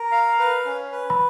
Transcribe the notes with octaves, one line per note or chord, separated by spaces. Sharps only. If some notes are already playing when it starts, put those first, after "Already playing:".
Already playing: A#4
F5
B4
C#4
B4
B5